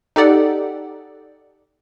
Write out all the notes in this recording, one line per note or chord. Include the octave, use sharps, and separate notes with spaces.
D#4 G4 A4 D5 F#5